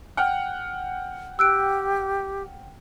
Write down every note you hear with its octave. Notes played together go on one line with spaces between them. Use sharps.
F#5 G5 F6
G4 E6 F#6 D7